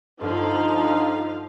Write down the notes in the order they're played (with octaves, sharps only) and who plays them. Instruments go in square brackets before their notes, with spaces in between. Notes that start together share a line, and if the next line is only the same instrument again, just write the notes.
[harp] G2 [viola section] D3 F3 F5 [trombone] D#4